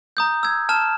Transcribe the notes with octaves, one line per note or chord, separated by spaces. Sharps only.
A#5 D#6 G6
E6 G#6
A5 F6 E7